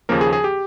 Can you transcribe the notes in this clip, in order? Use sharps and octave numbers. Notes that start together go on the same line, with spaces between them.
D#2 C#3 F3 A#3 A#4
G#4
G#4
G4